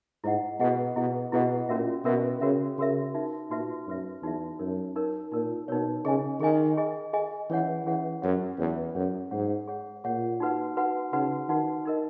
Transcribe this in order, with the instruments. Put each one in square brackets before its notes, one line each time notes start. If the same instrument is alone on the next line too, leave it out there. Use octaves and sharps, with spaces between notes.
[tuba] G#2 [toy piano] E4 G#4 D#5 F#5
[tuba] B2 [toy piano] E4 G#4 D#5 F#5
[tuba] B2 [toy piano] E4 G#4 D#5 F#5
[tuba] B2 [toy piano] E4 G#4 D#5 F#5
[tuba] A#2 [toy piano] C#4 F#4 A#4 E5
[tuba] B2 [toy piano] C#4 F#4 A#4 E5
[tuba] C#3 [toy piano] C#4 F#4 A#4 E5
[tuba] C#3 [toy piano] C#4 F#4 A#4 E5
[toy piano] D#4 F#4 B4 E5
[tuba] A#2 [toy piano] D#4 F#4 B4 E5
[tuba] F#2 [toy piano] D#4 F#4 B4 E5
[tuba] E2 [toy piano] D#4 F#4 B4 E5
[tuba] F#2 [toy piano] D#4 A#4 C#5
[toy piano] D#4 A#4 C#5
[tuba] A#2 [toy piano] D#4 A#4 C#5
[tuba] B2 [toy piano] D#4 A#4 C#5
[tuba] C#3 [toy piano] G#4 D#5 G#5
[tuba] D#3 [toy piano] G#4 D#5 G#5
[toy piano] G#4 D#5 G#5
G#4 D#5 G#5
[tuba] E3 [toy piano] C#4 G#4 C#5 F#5
[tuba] E3 [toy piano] C#4 G#4 C#5 F#5
[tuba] F#2 [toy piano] C#4 G#4 C#5 F#5
[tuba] E2 [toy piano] C#4 G#4 C#5 F#5
[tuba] F#2 [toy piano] G#4 C#5 F#5
[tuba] G#2 [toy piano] G#4 C#5 F#5
[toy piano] G#4 C#5 F#5
[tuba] A#2 [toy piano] G#4 C#5 F#5
[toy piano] D#4 F#4 B4 F#5
D#4 F#4 B4 F#5
[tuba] C#3 [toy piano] D#4 F#4 B4 F#5
[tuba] D#3 [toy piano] D#4 F#4 B4 F#5
[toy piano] D#4 A#4 D#5